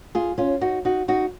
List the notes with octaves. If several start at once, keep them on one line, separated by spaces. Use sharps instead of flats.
F4 G#4
C#4 F4
D#4 F#4
D#4 F#4
D#4 F#4